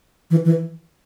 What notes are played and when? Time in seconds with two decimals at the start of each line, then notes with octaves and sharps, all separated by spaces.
0.31 E3
0.45 E3